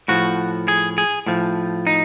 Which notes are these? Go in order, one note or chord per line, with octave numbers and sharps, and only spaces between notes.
A2 F3 F#4
G#4
G#4
A2 F3
D#4